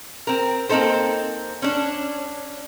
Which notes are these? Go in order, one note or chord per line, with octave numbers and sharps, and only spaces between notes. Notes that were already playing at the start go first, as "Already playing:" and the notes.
C4 A#4
A#3 C4 D#4 A4 C5
C#4 D4